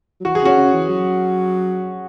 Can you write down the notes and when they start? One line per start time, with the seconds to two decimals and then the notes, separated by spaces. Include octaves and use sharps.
0.20 F#3
0.25 E3 F#4
0.35 G#4
0.41 C#3 C#4 F#4
0.57 C#3
0.73 E3
0.89 F#3